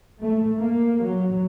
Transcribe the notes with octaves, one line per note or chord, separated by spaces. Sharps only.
A3
A#3
F#3